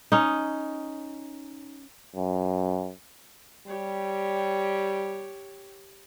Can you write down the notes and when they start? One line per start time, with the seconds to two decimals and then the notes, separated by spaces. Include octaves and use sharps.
0.12 C#4 D#4
2.16 F#2
3.67 G3 G4 C#5